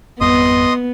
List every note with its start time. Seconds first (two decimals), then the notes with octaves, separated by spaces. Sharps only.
0.21 G#1 F2 G3 B3 D#5 C6 D#6